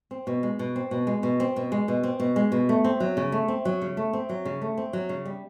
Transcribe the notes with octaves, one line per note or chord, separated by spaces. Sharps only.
C4
B2
G#3
B2
C4
B2
G#3
B2
C4
B2
G#3
B2
C4
B2
G#3
B2
A3
C4
F#3
C#3
A3
C4
F#3
C#3
A3
C4
F#3
C#3
A3
C4
F#3
C#3
G3